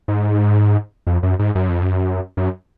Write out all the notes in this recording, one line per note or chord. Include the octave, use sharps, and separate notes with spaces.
G#2
F2
F#2
G#2
F#2
F2
F#2
F#2